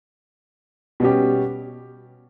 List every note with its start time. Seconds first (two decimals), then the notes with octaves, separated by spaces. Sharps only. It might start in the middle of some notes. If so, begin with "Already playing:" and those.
1.00 B2 G3 C#4 G4